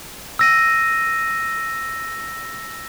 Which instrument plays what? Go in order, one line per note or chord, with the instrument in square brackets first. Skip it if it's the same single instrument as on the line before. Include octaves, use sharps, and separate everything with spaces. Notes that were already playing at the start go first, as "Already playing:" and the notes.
[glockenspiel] E6 A#6 D#7